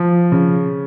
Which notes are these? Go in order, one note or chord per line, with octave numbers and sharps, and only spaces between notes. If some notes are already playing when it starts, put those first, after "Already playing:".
Already playing: F3
C#3